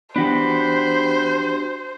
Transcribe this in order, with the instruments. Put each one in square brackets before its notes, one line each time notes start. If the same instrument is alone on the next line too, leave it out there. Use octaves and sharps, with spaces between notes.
[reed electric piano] E3 B3 [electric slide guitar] D4 F#4 G4 [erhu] C5 [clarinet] B5